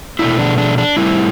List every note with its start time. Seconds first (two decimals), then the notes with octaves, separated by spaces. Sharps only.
0.19 B2 A3 D4 E4
0.39 D4
0.58 D4
0.78 D4
0.97 A2 G3 C4 E4